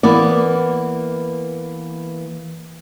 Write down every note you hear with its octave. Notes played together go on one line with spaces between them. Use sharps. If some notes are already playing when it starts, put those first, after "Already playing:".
E3 A#3 B3 D5